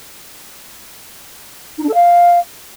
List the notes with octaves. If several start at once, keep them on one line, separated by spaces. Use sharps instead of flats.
D#4
D4
A4
F5